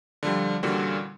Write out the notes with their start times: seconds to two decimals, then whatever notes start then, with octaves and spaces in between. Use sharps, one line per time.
0.23 D3 F3 G3
0.63 A#2 D3 E3 G3 C#4 F#4